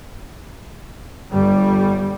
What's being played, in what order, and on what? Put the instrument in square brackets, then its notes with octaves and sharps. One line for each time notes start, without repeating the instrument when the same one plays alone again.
[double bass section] G1 G3